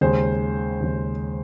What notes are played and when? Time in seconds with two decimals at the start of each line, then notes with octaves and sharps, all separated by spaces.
0.01 D#2 C#3 G#3 C5
0.81 D#2 C#3 G#3